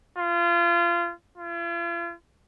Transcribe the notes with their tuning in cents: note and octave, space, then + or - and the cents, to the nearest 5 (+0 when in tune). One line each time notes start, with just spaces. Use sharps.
F4 -30
F4 -45